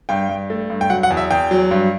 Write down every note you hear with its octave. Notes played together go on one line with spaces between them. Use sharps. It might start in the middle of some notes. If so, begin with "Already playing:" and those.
G2 G5
G2
A3
G2
G5
F#3 F#5
F#5
E2
E5
E2 G5
F#3
G2